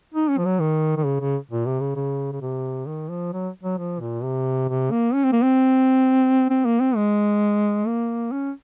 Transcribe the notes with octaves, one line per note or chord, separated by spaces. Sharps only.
D#4
C#4
F3
F#3
D#3
D#3
C#3
C#3
A#2
C3
C#3
C#3
C#3
C3
D#3
F3
F#3
F#3
F3
A#2
C3
C3
A#3
C#4
C4
A#3
C4
C4
A#3
C4
G#3
A#3
C#4